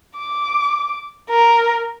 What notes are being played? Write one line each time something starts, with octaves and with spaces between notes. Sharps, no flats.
D6
A#4